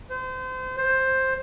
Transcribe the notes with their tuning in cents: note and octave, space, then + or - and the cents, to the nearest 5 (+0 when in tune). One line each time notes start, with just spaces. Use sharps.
C5 -30
C5 +10